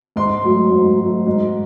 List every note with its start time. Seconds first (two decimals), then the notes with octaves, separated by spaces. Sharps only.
0.16 G#2 C6
0.43 F#3 A3
0.72 G#2
0.99 F#3 A3
1.27 G#2